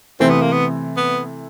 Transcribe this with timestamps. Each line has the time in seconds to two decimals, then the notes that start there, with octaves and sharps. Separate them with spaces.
0.20 C3 E3 A3 C4
0.30 B3
0.41 A#3
0.52 B3
0.97 B3